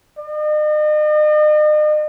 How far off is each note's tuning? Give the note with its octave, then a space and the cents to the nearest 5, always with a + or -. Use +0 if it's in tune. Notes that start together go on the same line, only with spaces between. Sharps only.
D#5 -40